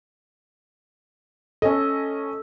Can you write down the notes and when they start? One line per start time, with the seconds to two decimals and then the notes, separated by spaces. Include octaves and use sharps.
1.62 C#4 A4 D#5